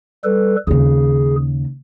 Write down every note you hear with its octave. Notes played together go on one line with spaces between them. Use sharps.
G3 A4 B4
D#2 C#3 G#4